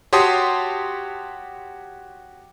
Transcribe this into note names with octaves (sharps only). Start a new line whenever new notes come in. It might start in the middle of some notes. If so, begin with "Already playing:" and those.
F#4 G4 C#5 A5 C6 D#6